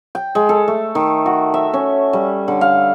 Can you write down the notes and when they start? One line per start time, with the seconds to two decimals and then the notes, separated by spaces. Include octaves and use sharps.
0.15 G5
0.35 G#3
0.49 A4
0.68 A3
0.95 D#3
1.26 F#4
1.54 E5
1.73 C#4
2.13 G3
2.48 D3
2.61 F5